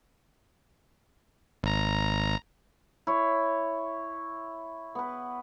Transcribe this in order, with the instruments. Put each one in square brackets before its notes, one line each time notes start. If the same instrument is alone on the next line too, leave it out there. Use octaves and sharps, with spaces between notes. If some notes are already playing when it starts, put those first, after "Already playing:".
[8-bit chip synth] G#1 A#5
[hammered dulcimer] E4 C#5
B3 B4